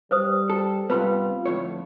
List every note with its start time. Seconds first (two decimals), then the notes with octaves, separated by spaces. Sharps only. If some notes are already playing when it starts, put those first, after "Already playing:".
0.11 G3 B4 C5 D#6
0.50 A4
0.90 G2 C3 B3 F4 B4 B5 C6
1.46 F2 A2 D3 A3 C#5